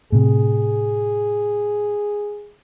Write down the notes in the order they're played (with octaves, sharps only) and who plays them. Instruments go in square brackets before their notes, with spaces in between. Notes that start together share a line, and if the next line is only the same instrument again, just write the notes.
[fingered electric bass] A2 C3 [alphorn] G#4